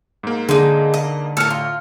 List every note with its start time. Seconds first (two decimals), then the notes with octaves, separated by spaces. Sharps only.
0.23 G#2 A#3
0.49 D3 G#3 D#4
0.94 D#5
1.37 A2 A4 A#4 F6 C#7
1.50 F4